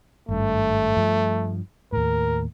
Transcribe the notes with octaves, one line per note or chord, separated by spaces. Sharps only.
G#1 G2 A3
G2 F3
D#2 A2 A#4